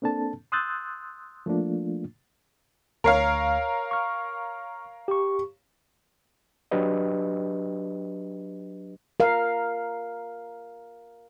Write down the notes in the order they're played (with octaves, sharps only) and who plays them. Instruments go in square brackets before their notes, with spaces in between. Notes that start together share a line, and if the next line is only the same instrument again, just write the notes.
[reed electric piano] A#3 C4 D4 A4 A5
C6 D#6 E6 F#6 G6 A6
F3 A3 A#3 D4 F4
[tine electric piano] D2 C7 [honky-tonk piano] A#4 C#5 F5
[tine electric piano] C#6 F6
G4 C#6
[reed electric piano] F#3 D4 G4 B4 D#5
[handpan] A#4 F5